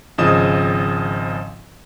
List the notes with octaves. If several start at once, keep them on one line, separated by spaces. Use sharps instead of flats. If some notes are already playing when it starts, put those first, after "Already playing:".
G#1 C#3 F3 D#5 D#6 E7